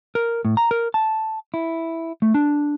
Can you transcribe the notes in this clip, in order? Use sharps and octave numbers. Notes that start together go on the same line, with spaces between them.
A#4
A2
A#5
A#4
A5
E4
A3
D4